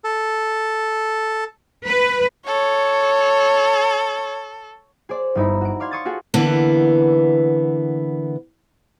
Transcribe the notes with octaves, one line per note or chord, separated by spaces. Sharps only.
A4
B4
A4 C#5
G#4 C5 D5
G1 G2 D#4 E4 A#5 B5
F#4 D7
D5 F5 C6 G#6
C6 C#6 D#6 G#6 A6
F4 F#4 G#4 A4
D3 E3 A#3 B3